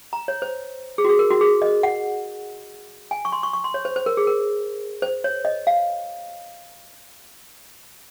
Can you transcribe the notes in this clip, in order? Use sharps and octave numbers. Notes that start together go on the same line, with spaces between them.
A#5
C#5
C5
G#4
F#4
G#4
A#4
F#4
G#4
D#5
F#5
G#5
C#6
C6
C#6
C#6
C6
C#5
C5
C5
A#4
G#4
A#4
C5
C#5
D#5
F5